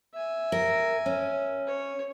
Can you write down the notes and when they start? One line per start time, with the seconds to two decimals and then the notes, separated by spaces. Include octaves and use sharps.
0.13 E5 G#5
0.52 A#4
1.06 C#4
1.67 C#5